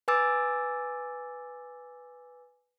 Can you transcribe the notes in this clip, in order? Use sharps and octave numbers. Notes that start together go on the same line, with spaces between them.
B4 G#5 D6 E6 A6